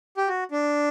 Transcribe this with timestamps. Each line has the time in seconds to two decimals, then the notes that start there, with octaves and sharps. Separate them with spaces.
0.17 G4
0.28 F#4
0.51 D4